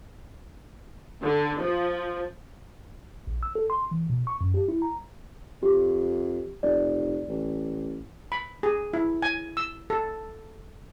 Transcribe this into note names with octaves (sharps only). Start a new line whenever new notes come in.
D3
F3
A#1
E6
A4
C6
E3
B2
C#6
F#2
G4
E4
A#5
F2 G4
F1 D5
A1
B5
G#4
E4
G#5
E6
A4